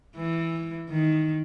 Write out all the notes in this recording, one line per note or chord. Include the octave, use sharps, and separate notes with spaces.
E3
D#3